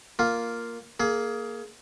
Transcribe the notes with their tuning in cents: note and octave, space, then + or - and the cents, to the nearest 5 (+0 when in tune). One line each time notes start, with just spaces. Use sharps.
A#3 +0 F4 +0
A#3 +0 G#4 +20